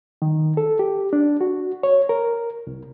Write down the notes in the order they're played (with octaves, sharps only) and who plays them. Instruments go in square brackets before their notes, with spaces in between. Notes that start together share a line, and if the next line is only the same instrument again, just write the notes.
[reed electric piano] D#3
A4
G4
D4
F#4
C#5
A#4
C2